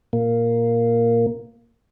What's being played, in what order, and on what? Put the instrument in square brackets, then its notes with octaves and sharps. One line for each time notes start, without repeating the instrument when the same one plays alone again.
[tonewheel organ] A#2 A#3